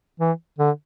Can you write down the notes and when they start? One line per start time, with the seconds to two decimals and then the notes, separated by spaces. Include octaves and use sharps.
0.20 E3
0.59 D3